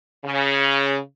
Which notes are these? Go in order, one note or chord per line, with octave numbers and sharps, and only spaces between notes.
C#3